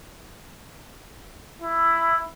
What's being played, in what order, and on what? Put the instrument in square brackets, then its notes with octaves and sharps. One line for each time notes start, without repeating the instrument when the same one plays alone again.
[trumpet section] E4